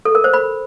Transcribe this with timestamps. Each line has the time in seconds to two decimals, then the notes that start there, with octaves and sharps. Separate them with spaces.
0.05 A4
0.15 A#4
0.24 C5
0.34 B5